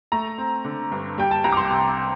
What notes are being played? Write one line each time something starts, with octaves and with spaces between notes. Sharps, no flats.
A3 A#5
C4
D3
G2
G3 G5
A5
C2 A#5
D6
C6
C3